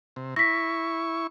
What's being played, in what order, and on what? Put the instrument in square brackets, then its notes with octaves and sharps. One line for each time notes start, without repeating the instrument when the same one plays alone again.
[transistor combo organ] C3
[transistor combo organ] E4 C#6 [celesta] A#6 B6